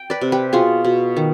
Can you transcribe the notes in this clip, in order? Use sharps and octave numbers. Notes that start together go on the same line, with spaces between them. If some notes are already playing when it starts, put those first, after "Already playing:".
Already playing: G5
B4 D5
C3
G4 B4
B2 F4 G#4
B2
D#3